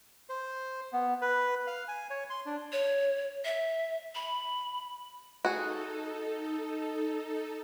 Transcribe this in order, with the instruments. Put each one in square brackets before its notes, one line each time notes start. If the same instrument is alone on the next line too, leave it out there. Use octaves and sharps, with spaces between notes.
[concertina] C5
B3
B4
F5
G#5
C#5
C6
D4
[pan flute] C#5
E5
B5
[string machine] D#4 A4 [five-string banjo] F#4 G#4